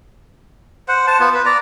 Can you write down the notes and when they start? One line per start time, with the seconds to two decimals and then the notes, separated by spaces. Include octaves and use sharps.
0.88 C5 F#5
1.07 C5 A5
1.20 B3 F4
1.34 B4
1.46 D5 A#5